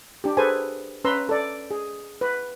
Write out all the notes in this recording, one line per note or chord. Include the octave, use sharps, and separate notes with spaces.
D4 G4
G#4 A4 B4 C5 G#5
C#4 B4 A#5 C6 E6
A4 D5
G#4
B4